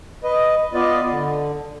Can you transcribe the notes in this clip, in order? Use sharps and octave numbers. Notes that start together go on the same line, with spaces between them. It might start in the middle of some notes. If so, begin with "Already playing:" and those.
B4 D#5
B3 F4 B4 D5 D#5
D3